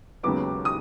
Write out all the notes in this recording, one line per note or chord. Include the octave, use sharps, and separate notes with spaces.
E1 D#2 C#3 F#3 B3 D6
D#6